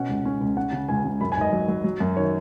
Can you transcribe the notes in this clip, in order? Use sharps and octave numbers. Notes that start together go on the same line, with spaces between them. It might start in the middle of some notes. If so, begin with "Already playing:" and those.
Already playing: B2 C#4 F#5
C#2
C#4
C#2
C#4 F#5
C#3
C#2 G#5
C#3
F#2 B5
G#5
G#1 D#5
F#3
F#3
F#3
F#2
D#3 C#5